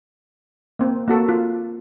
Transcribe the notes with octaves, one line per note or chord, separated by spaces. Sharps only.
A#3 C4
A#3 F#4 A4
F4